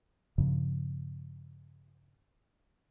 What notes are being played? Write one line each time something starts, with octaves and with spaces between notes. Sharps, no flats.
G2 A#2 C#3 F3